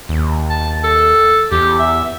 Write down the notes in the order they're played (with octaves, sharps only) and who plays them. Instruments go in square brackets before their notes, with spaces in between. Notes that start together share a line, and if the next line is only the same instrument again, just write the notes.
[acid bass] D#2
[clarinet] A5
A4
[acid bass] E2 [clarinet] G4
[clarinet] E5